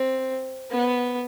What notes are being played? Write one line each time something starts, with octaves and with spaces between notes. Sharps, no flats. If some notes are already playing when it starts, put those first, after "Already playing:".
Already playing: C4
B3